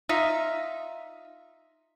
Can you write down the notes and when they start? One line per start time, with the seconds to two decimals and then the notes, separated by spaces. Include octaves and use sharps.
0.09 D#4 F4 E5